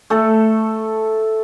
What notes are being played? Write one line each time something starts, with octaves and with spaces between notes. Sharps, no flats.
A3 A4